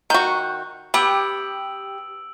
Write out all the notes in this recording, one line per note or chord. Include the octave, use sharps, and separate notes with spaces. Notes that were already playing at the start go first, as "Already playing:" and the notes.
D#3 F#4 C#6 G6
B3 G4 E6 D7 F#7